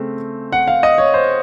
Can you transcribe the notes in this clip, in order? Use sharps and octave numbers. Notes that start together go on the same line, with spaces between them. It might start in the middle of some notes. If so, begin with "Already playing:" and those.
Already playing: C#3 A3 C4
F#5
F5
D#5
C#5
C5